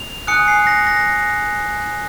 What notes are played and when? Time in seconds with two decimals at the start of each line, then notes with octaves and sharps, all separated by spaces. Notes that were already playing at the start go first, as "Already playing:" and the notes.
Already playing: F7
0.27 G#5 D#6 F#6 C#7
0.48 C7
0.67 A#6
0.87 A#6